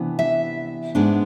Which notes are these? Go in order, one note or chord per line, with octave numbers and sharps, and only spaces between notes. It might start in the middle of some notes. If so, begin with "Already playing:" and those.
Already playing: C3 E3 B3 D4
E5
G#2 G#3 B3 D4